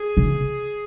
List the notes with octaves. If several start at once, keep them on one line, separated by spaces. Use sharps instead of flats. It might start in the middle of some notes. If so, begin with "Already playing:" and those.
Already playing: G#4
C#3